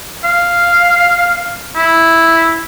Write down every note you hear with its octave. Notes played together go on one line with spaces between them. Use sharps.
F5
E4